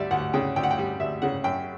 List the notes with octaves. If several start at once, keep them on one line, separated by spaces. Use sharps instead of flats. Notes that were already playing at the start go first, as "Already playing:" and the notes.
Already playing: D2 G3 D5 E5
D2 F#5
C#3 G5
D2 G5
F#5
G5
G3
D2 E5
C#3 F#5
F#2 G5